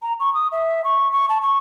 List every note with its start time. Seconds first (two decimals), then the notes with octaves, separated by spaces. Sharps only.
0.02 A#5
0.20 C#6
0.34 D#6
0.52 E5
0.84 C#6
1.12 C#6
1.29 A5
1.42 C#6